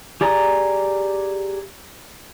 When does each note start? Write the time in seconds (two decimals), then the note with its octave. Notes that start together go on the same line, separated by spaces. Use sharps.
0.21 G4 G#4 D5 A#5 D#6